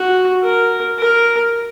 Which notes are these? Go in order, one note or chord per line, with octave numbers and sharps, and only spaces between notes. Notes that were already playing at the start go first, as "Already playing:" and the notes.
Already playing: F#4
A#4
A#4